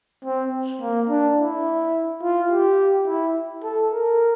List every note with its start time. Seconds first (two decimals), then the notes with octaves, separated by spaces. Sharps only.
0.25 C4
0.81 A#3
1.09 D4
1.38 E4
2.23 F4
2.51 G4
3.07 E4
3.64 A4
3.92 A#4